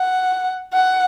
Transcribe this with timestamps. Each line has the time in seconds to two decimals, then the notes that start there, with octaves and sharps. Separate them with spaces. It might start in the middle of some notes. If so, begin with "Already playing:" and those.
Already playing: F#5
0.73 F#5